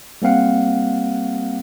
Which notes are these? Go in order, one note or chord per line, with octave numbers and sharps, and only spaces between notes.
G3 A#3 C4 F5 F#5